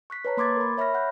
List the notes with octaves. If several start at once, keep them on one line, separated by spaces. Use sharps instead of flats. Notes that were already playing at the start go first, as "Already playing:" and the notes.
C#6 F#6 B6 C7
B4 C#5 A5 A#5
A#3 C6 D6 G#6 A6
A#4 B5
C#5 E5 B5 C#6 F6 A#6
F#5 F#6 G6